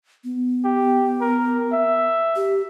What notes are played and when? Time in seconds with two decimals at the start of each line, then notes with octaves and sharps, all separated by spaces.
0.24 B3
0.65 G4
1.21 A#4
1.73 E5
2.36 G4